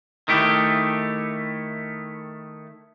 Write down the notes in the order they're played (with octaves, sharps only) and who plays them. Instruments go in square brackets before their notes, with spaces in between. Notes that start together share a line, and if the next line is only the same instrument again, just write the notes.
[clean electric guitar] D#3 A3 E4 G4